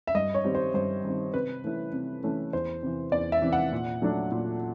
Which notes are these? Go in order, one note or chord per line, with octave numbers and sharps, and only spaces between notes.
E5
G2 D#5
C#5
D#3 G3 C4
C5
G2 C5
D#3 G3 C4
C3 B4
E3 A3 C#4 E4
C3
E3 A3 C#4 E4
E2 C5
C3 E3
E2 D5
E5
C3 E3
F#5
A#2
F#3 A3 D4
A#2